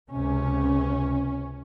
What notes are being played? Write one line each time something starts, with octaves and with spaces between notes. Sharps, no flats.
C#2 C3 C#4